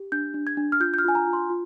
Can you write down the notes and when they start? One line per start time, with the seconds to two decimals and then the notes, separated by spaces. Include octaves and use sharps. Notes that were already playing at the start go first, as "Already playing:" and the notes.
Already playing: G4
0.12 D4 G6
0.34 D4
0.47 G#6
0.57 D4
0.72 F6
0.80 F4 G6
0.94 G6
0.98 F6
1.05 F4 G#5
1.15 A#5
1.27 F4
1.33 C6
1.50 F4